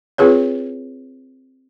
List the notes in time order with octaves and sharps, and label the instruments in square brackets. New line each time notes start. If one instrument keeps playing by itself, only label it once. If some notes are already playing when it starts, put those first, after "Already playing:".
[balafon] C4 F4 G#4 B4 C#5